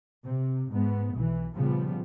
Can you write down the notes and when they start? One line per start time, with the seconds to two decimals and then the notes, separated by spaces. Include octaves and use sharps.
0.24 C3
0.71 G#2 B3
1.13 B1 E3
1.55 A#2 C#3 F3 G3 B3